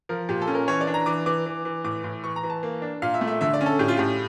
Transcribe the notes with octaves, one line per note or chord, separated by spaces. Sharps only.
F3 A#4
A#2 G4
A4
C#4
A#4
E3 C#5
D5
D4
A#5
E3 D6
E3 D6
E3
E3
A2 D6
A2
E3 C#6
A#5
E3
A5
A#3
D4
A#2 F5
E5
A3
E5
D3 E5
D5
C#4
A4
A2 G4
F4
A2 G4